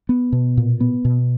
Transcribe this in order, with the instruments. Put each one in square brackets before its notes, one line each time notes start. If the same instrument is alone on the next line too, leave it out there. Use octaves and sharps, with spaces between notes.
[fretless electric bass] B3
B2
A#2
B3
B2